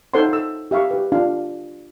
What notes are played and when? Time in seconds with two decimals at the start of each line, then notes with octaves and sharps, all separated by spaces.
0.14 D#4 A4 C5 C#5 F#5 C6
0.29 A4 E6
0.71 G4 E5 F5 C#6
0.91 G4 B4
1.12 D4 F4 F5